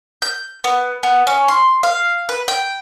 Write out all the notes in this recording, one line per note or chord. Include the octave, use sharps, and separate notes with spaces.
G6
B3
B3
C#4
C6
F5
B4
G5